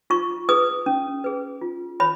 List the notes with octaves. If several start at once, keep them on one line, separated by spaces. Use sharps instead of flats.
F4 C#6
G#4 B4 D#6
C#4
G#4 B4
F4
C#5 B5